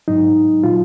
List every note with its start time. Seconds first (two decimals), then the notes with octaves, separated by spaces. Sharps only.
0.08 G#2 F#3 D#4
0.64 A#2 F#3 F4